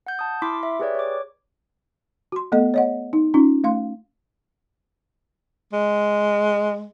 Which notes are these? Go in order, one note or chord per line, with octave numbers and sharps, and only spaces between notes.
F#5 G6
A5 D#6
E4 C6 D6 B6
E5
G4 G#4 B4 C#5 D5
C#5 D6
F#4 C6
A3 B3 A4 D#5
C#5 D#5 F#5
D#4
C#4 D#4 F4
A3 F5 C6
G#3